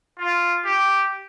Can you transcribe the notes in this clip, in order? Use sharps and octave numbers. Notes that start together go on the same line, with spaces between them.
F4
G4